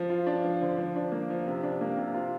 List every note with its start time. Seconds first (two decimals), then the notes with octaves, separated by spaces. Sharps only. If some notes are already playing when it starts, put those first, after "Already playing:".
Already playing: F3
0.10 F4
0.27 D4
0.44 F3
0.61 D3
0.78 F3
0.96 D4
1.12 A#3
1.30 F3
1.47 C3
1.63 D4
1.81 A#3
1.97 C3
2.14 F4